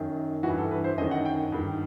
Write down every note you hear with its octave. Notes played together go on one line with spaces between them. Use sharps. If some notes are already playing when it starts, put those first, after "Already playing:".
Already playing: F#2 D#3
E3 F#4
G2
A4
B4
C5
F#2 D#3 D#5
F#5
G5
G2 D#3